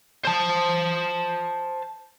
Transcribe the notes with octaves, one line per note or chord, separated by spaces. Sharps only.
C5 A5